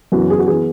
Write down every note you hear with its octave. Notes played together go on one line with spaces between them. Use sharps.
F#2 C#3 E3 B3 F#4
G#4
F#4
E3 B3 G#4